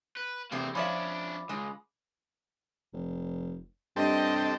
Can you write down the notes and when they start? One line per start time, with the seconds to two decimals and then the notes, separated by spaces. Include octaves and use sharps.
0.17 B4
0.52 E2 C3 A3 A#3 C5
0.75 F3 C#4 D4 D5 E5 B5 D6
1.49 C#2 G#3
2.93 F1
3.96 G2 C4 G4 A4 D#5